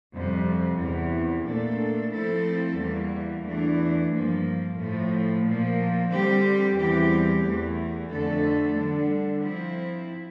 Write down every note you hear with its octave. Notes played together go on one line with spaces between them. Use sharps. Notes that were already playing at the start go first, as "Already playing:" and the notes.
F2 C3 G3
E2 C3 E3
A#2 A3 D4 A4
F3 A3 C4 E4 A4
E2 E3 G3 A#3
E2 E3 A3 D4
G2 F3 A#3
A2 F3 A3
A#2 F3 A#3
D3 G3 C4 G4
E2 E3 G3 C4 G4
E2 E3 A3
F2 D3 A3 D4 A4
D3 G3 D4
F3 C4 E4